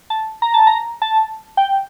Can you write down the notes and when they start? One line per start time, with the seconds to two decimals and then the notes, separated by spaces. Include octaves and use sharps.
0.10 A5
0.42 A#5
0.54 A5
0.67 A#5
1.02 A5
1.57 G5